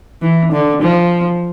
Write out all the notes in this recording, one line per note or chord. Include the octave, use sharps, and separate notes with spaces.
E3
D3
F3